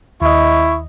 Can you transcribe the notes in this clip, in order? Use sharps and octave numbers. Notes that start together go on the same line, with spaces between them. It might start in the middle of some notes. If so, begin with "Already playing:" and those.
D#2 E4 D#5 C#6